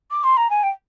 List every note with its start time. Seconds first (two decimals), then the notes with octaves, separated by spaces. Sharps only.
0.10 D6
0.23 C6
0.36 A#5
0.49 G#5
0.63 G5